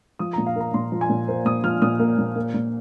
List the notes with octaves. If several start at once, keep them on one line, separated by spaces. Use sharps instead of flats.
F3 D#6
A#5
A#2
F5
A#3 A#5
A#2 C6
F3
G#5
A#2
A#3 C5
A#2 D#6
F3 F6
A#2 D#6
A#3
A#2
A#3
A#2